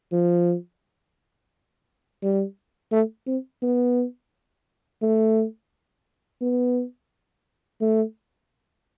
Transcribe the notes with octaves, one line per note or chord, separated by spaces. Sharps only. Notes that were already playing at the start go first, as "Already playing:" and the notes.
F3
G3
A3
C4
B3
A3
B3
A3